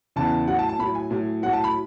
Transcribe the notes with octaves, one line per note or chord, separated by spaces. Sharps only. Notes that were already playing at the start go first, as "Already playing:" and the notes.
E2 C#3 E3 A5
A2 F#3 F#5
A5
A5
A2 F#3 B5
G#5
A2 F#3
A2 F#3 F#5
A5
B5